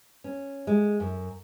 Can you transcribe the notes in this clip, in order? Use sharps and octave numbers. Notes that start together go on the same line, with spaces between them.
C#4
G#3
F#2